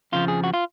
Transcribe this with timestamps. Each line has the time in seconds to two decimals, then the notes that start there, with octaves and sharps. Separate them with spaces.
0.12 F2 C#3 F3 F4
0.28 G#4
0.44 F#4
0.54 F4